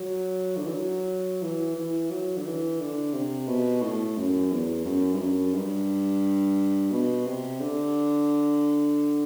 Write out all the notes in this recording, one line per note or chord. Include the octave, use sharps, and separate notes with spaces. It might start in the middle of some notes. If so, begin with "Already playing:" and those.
Already playing: F#3
D3
E3
F#3
E3
E3
F#3
D3
E3
D3
C3
B2
A2
F#2
E2
F#2
G2
F#2
G2
B2
C3
D3